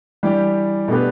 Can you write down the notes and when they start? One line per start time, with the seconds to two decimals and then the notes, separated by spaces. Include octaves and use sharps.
0.23 E3 G3 D4 G4 D5
0.88 B2 A3 D4 G4 B4